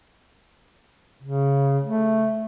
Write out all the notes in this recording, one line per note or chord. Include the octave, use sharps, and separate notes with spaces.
C#3
A3